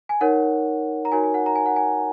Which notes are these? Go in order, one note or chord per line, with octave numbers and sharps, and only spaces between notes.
G#5
D#4 A#4 C#5 F#5
A#5
D#4 F#4 A#4 C#5 G#5
G#5
F#5
A#5
G#5
F#5
G#5